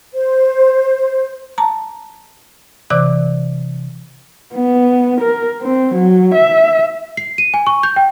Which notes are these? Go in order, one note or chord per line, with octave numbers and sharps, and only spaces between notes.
C5
A5 A#5
C3 E3 D5 D6 F#6
B3
A#4
C4
F#3
E5
C7
D#7
G#5
C#6
G6
G5